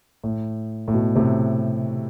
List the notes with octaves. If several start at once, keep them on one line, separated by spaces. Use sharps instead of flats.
A2
A2
B2
A2 C3